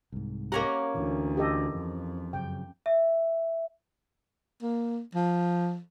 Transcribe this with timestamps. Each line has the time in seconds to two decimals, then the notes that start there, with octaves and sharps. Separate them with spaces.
0.12 C2 G#2
0.52 A#3 C#4 G4 F#5 A#5
0.95 D2 E3
1.37 G4 A4 D#5
1.75 F2
2.33 F#2 C#3 G5
2.86 E5
4.62 A#3
5.15 F3